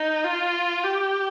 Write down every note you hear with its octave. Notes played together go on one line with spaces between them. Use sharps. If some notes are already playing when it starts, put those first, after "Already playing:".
Already playing: D#4
F4
G4